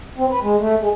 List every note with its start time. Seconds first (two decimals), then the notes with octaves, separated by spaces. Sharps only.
0.18 C4
0.30 B4
0.42 G#3
0.59 A3
0.80 G#3